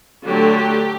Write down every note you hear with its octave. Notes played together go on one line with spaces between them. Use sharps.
D3 F#3 A3 D4 G4